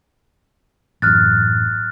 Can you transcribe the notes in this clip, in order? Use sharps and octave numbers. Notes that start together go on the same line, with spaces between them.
A1 F#2 F6 F#6 A6